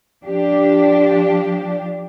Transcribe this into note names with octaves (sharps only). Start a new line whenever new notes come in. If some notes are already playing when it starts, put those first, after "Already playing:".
F3 D4 G4